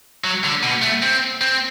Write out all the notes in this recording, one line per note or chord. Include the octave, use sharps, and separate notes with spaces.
F#3
D3
B2
A3
C4
C4